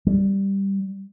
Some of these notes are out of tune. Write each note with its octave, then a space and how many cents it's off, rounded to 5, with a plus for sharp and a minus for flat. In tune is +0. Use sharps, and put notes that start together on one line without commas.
G3 +0